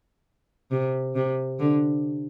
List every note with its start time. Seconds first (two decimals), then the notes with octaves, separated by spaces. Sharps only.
0.71 C3
1.15 C3
1.59 D3